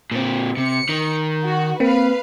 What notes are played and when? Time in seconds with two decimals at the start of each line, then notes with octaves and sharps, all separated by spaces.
0.11 A#2 C4
0.57 C3 C#7
0.89 D#3
1.44 F#4
1.80 A#3 C4 B4 F5